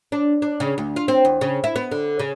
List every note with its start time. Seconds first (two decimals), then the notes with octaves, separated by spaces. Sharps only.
0.12 D4
0.42 D4
0.60 C#3
0.78 D2
0.96 F4
1.08 C4
1.25 E2
1.41 C#3
1.64 E4
1.76 B3
1.91 D3
2.19 C#3